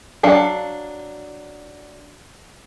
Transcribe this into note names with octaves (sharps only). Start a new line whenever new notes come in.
F#3 D4 F5